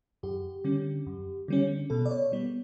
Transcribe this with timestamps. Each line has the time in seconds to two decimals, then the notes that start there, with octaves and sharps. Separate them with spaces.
0.23 F#2 G4
0.64 D3 G3 C#4
1.07 F#2
1.48 D3 G3 C#4
1.90 B2 A4
2.06 D5
2.11 C#5
2.32 G3 B3